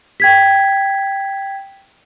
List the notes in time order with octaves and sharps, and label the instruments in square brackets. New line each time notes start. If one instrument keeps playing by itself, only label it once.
[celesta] G5 G#6 B6